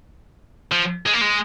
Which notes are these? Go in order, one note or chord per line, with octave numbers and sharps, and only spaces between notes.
F3
G#3
A#3
G#3